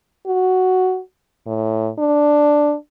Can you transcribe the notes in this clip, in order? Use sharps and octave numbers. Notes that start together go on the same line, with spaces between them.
F#4
A2
D4